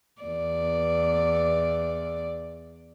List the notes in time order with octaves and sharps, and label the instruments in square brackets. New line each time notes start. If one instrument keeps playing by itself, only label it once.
[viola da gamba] E2 D5